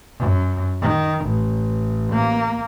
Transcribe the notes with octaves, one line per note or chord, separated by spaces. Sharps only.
F#2
D#3
A1
A#3